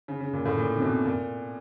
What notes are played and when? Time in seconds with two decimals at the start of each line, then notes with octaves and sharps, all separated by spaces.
0.08 C#3
0.20 C#3
0.33 A#2
0.45 A2
0.57 A#2
0.77 C3
0.82 B2
1.05 A#2